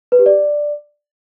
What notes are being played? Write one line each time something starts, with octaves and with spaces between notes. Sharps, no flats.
B4
G4
D5